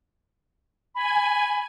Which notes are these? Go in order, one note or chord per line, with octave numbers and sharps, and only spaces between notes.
G#5 B5